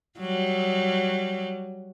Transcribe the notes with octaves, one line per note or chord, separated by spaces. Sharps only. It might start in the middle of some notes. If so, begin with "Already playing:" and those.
F#3 G3